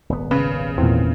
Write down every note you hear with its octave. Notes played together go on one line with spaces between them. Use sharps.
D#1 G#1 B3
C#3 B4
E2 A#2 C4